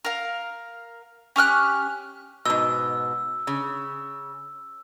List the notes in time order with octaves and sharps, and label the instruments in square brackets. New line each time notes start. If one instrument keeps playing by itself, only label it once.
[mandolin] A#4 F5
C#4 G4 F6 F#6
[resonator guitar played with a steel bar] G#2 B2 [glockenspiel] E6
[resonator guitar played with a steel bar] C#3